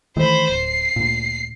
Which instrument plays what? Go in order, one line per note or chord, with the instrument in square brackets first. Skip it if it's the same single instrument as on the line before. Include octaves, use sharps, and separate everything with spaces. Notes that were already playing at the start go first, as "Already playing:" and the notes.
[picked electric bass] D#3 E3 A3 [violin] C5 B5
[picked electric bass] D1 [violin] C7
[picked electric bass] D2 A#2